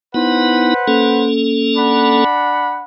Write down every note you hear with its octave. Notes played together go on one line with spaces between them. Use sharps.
B3 D#4 E4 B4 C5 F#5
A#3 C#4 A4
D4 F#5 B5